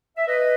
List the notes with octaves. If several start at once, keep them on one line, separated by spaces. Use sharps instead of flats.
E5
B4 D#5